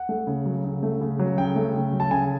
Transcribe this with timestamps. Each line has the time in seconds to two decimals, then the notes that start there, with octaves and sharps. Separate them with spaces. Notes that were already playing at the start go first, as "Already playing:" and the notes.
Already playing: F#5
0.09 A3
0.27 C#3
0.46 F#3
0.64 C#3
0.83 A3
1.01 C#3
1.19 F#3
1.38 C#3 G5
1.56 A3
1.75 C#3
1.93 F#3
2.00 A5
2.11 C#3 G#5